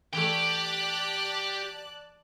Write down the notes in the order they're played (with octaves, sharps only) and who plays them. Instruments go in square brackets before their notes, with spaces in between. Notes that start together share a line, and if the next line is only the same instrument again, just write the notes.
[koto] E3 A3 [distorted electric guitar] G4 G5 [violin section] D5 A5 F#6